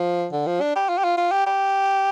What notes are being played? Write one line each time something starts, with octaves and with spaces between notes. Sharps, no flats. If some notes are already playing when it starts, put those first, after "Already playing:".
Already playing: F3
D3
F3
D4
G4
F4
G4
F4
F4
G4
G4